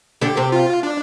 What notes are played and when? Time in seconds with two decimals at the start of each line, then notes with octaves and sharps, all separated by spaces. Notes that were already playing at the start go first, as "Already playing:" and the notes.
0.21 D3 D4 G4
0.37 C3 C4
0.52 F4
0.83 D4